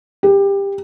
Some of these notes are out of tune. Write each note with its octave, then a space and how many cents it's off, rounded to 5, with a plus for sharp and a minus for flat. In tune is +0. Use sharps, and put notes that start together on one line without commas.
G4 +20